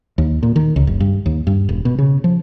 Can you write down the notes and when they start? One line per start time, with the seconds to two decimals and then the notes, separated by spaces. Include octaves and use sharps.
0.18 D#2
0.43 A#2
0.56 D#3
0.76 C#2
0.87 F#1
1.00 G2
1.26 D#2
1.47 G2
1.69 E1
1.85 B2
1.99 C#3
2.24 F3